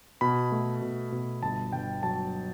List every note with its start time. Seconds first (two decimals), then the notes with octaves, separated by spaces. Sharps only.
0.21 B2 B5
0.52 A3
0.82 B2
1.12 B2
1.43 G1 A5
1.73 G1 G5
2.03 F#3 A5